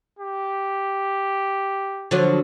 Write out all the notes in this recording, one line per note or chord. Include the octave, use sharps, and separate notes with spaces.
G4
D3 F3 F#3